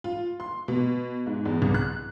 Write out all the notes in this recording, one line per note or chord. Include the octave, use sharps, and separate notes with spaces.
F4
C6
B2
G#2
E2
C2
F#6